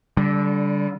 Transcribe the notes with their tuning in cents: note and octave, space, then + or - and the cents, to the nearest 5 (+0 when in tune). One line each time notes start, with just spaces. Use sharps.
D3 -25 G3 +0